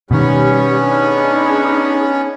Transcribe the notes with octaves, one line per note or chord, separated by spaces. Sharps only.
B2 D#3 G3 B3 C#4 B5 C#6
D4 D#4 G#4